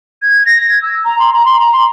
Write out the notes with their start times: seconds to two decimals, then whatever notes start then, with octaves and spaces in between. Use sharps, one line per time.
0.22 G#6
0.46 A#6
0.69 G#6
0.82 E6
1.05 A#5
1.19 C6
1.32 A#5
1.45 C6
1.59 A#5
1.72 C6